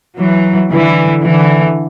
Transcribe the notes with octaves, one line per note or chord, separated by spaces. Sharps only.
E3 F#3
D3 E3
D3 E3